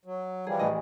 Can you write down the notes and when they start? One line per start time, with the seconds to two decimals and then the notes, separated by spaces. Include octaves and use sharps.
0.05 F#3
0.47 E3 F3 G3 G#4
0.59 A1 D#5